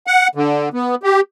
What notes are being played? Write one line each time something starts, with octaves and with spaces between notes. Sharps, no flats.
F#5
D3
B3
G4